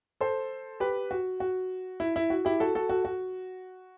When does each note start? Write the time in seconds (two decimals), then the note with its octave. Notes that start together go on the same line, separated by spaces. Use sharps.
0.21 A4 C5
0.80 G4 B4
1.11 F#4
1.40 F#4
2.00 E4
2.16 E4
2.30 F#4
2.45 E4 G4
2.60 F#4 A4
2.75 F#4 A4
2.89 F#4 A4
3.05 F#4